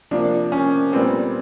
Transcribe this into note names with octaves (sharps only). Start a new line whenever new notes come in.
C3 F3 A#3 D4
C#4
A#2 G3 B3 C4